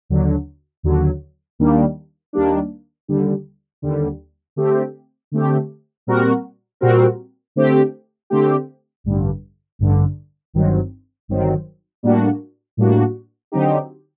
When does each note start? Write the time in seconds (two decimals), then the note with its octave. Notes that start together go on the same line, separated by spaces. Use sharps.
0.09 D#2 D3 F#3
0.83 D#2 D3 F#3
1.59 D#2 D#3 G3 A#3 D4
2.33 D#2 D#3 G3 A#3 D4
3.08 D#2 D3 G3
3.82 D#2 D3 G3
4.56 D3 A3 C4 G4
5.31 D3 A3 C4 G4
6.07 A#2 G3 C4 F#4 A#4
6.81 A#2 G3 C4 F#4 A#4
7.56 D3 A3 C4 G4
8.30 D3 A3 C4 G4
9.04 A1 G2 D3
9.79 A1 G2 D3
10.54 G1 G2 D#3 F#3 C4
11.28 G1 G2 D#3 F#3 C4
12.03 A2 G3 A#3 D4 F#4
12.77 A2 G3 A#3 D4 F#4
13.52 D3 F#3 C4 D#4 G4